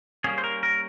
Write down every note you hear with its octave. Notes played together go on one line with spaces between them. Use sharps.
G3 A#3 C#4 G#4
C5
A#4
A#4